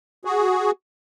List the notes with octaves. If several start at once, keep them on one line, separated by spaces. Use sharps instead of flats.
F#4 G#4